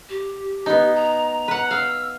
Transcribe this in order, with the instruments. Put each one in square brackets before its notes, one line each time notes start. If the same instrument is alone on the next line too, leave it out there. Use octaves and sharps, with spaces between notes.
[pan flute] G4
[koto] B3 D#4
[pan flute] A#5
[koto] B4 F#5
[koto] F5 [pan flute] E6